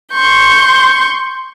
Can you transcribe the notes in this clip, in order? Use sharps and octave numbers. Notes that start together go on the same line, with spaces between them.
C6 C#6 G6